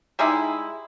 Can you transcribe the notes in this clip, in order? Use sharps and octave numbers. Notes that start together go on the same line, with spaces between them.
G3 G#3 D#4 E4